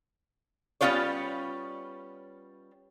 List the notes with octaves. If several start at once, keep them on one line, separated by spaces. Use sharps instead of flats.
G3 B3 C#4 F4 C5 C#5